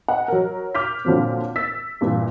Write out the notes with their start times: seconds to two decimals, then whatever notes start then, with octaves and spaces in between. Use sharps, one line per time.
0.08 D#5 F#5
0.28 F#3 A#4
0.75 D6 F6 G6 B6
1.05 A#2 D3 F3 F#3 C4
1.56 E6 A6 B6
2.01 G2 A#2 E3